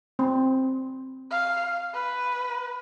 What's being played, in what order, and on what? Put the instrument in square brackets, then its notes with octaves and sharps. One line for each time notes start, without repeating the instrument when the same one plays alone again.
[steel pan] C4
[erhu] F5
B4